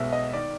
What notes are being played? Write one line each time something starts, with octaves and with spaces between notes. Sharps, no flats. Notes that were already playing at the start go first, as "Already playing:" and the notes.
Already playing: B1 B2 G#3 B3 E5
D#5
D#3 D5